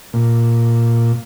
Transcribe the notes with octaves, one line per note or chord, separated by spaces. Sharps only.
A#2